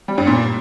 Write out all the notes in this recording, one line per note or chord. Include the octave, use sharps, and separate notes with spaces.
G3
G2
A#2